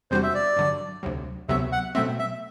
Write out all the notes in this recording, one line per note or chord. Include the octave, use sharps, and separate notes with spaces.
E2 C3 G3 D4 F#4 C5
E5
D5
G2 D3 F#3
D2 C3 F#3
D2 C3 F#3 B3 E5
F#5
B2 F#3 A3 C4 E5
E5